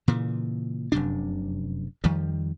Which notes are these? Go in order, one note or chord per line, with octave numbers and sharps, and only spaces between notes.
A#2 C#3 E3
F1 F#2 C3 D4
F2 D#3 F3 G3